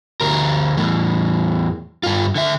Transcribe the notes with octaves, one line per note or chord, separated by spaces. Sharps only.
D2 A#4
E2 A2
G2 F4
D3 E5